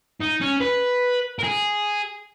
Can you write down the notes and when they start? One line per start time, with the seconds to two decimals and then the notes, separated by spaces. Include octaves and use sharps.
0.20 D#4
0.41 C#4
0.61 B4
1.39 A#4
1.43 G#4